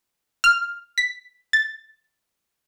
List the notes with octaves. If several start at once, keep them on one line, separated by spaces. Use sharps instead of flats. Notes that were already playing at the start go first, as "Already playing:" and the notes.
F6
B6
A6